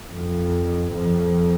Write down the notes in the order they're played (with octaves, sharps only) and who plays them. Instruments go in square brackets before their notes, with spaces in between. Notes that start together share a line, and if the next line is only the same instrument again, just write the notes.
[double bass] F2
F2